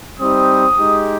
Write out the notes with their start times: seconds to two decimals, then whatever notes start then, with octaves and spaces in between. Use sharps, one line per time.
0.19 G3 C4 D#4 G4 D#6
0.78 G#3 D#4 G4